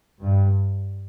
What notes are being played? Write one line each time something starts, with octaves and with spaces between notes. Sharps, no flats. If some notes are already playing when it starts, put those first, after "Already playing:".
G2